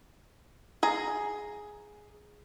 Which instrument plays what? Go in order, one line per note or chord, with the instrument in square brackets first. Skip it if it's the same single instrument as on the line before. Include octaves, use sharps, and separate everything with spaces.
[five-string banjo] G#4 A#5